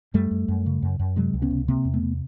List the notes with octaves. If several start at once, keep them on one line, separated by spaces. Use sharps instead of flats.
F#2 G3 A3
F#2
F#2
C#3
F#2
F#2
C3 F#3 G#3
C#2
B3 C#4
C3
C3 A#3 C4
E2
A3 B3
C3